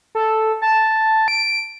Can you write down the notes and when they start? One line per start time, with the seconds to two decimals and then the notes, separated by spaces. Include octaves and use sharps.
0.15 A4
0.62 A5
1.28 D7